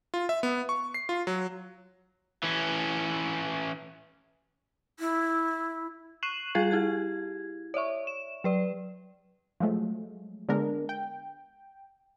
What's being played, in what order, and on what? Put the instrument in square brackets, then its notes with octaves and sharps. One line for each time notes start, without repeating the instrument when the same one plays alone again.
[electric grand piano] F4
E5
B3
C#6
C7
F4
F#3
[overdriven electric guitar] E3 C#4
[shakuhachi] E4
[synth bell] C#6 F#6 C7 D#7 E7 F#7
G3 F4 G#4 F5 G#6 C7
E4 G4 G#6
C#5 D5 E5 C#6
E7
F#3 B4 D5
[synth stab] F3 F#3 G#3 A3
D3 G#3 B3 D4 A#4
G5